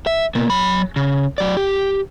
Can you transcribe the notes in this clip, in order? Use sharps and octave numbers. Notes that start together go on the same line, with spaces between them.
E5
B2 A#3
F#3 B5
C#3
F#3 D5
G4